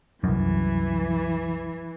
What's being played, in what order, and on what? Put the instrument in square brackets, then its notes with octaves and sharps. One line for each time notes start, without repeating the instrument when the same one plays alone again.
[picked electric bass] C2 F#2 [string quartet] E3